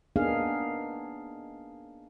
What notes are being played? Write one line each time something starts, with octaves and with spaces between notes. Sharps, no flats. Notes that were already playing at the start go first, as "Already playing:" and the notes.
A#3 B3 D4 D#4 G#4 F5